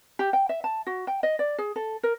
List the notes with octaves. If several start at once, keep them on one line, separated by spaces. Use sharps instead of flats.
G4
G5
E5
A5
F#4
G5
D#5
D5
G#4
A4
A#4